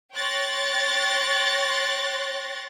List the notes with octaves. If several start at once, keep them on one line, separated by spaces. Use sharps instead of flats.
C#5 G5 C6 F#6 A6 A#6